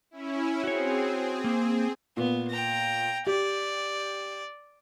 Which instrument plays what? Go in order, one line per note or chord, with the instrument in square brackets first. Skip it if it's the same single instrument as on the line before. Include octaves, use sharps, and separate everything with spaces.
[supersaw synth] C#4 E4
[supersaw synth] C4 G#4 [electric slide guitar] F#4 C#5
[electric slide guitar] A#3
[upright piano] A#2 [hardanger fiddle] B3
[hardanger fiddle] G5 A#5
[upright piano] G4 [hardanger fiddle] D5